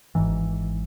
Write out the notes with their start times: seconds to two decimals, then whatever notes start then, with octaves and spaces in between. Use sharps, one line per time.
0.15 G#1 G#2 E3